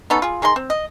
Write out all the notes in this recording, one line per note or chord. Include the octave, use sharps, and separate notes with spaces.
B3 C#4 D#4 A4
F4 G#4
D#3 G#4 A#5 C6
C4
D#5